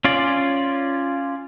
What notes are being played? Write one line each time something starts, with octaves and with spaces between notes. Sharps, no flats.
C#4 F4 D5